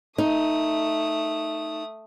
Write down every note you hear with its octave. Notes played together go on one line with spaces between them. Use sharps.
A3 D#4 D#6